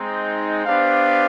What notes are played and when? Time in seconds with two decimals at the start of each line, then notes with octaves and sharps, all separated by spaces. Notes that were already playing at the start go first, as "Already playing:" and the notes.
Already playing: G#3 C4 D#4
0.65 B3 D4 G4 C5 F5